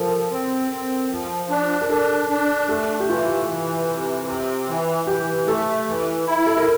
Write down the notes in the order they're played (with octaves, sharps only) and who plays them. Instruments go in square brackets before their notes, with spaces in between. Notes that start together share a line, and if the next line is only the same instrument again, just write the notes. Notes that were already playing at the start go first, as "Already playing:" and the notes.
Already playing: [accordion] F3 [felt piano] A4 A#4
[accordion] C4
C4
F3
D4
[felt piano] A#4
[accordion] D4 [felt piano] A4
[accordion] D4
[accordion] A3 [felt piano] A4
[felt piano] G4
[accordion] E3 [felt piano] F4
[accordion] E3
C3
C4
E3
[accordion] E3 [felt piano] G4
[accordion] A3 [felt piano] A4
[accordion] E3
E4
[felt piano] A4
A#4